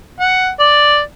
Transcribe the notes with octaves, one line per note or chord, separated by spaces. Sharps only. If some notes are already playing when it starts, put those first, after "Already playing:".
F#5
D5